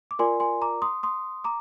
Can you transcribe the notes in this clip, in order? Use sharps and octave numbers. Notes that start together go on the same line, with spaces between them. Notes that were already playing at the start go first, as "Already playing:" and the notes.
D6
F4 A#4 D5 G#5 C6
G#5 C6
A#5 D6
C6 D#6
C6 D#6
A#5 D6